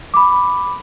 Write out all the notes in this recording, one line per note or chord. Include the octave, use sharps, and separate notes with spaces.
B5 D6